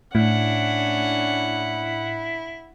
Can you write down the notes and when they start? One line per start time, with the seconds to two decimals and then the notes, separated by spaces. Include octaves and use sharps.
0.15 A2 C#4 D4 E4 F#5